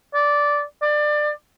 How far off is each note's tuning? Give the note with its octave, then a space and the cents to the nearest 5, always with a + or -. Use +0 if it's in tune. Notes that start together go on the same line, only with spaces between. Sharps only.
D5 -10
D5 +25